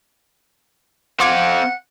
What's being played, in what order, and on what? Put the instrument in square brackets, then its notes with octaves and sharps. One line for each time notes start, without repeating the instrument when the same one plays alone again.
[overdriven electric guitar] C4 F5 [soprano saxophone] F#5 [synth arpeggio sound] C6 D6 G#6